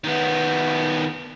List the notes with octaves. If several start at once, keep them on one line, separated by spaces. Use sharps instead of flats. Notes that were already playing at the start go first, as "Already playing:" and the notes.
D#3 B3